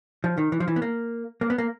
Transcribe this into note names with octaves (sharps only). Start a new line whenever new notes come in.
F3
D#3
E3
F3
E3
B3
A#3
A#3
B3
A#3